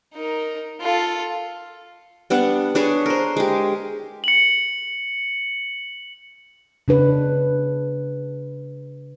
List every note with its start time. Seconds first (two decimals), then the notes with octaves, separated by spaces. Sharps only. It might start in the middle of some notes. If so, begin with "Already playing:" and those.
0.15 D#4 A#4
0.81 F4 A4
2.30 G3 B3 D4 F#5
2.75 D4 G#4 B4 C#5
3.06 A#4 C5
3.36 G#3 G4
4.24 C#7 F#7
6.88 C#3 D4 B4